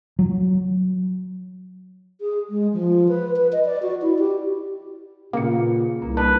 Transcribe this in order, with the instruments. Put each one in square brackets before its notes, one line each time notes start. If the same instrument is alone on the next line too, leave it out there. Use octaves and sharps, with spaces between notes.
[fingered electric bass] F#3
[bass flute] G#4
G#3
F3
B4
B4
D#5
D5
F#4
E4
G4
[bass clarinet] A#2 [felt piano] C#3 B4 C#7 [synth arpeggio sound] A#3
[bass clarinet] C2 [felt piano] A#3
[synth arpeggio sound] D4 [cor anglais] B4